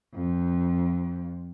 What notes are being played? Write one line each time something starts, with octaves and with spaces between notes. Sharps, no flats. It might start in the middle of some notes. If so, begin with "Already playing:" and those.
F2